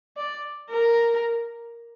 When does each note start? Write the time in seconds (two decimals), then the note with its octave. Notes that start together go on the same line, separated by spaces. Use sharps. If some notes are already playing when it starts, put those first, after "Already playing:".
0.17 D5
0.70 A#4